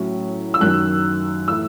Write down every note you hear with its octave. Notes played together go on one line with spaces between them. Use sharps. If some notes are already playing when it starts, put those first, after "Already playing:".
Already playing: A2 F#3 C#4 E4
E6
F#2 D#3 F#3 F#6
A2 E3 A3 E4 E6